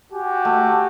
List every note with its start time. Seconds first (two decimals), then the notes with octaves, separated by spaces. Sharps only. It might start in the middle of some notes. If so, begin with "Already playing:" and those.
0.12 F#4 G4 G#5
0.45 A3